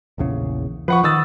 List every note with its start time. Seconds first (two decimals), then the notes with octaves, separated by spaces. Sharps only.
0.18 A#1 E2 C#3
0.88 F3 B4 F#5 C#6
1.04 D#3 D#6 E6 A6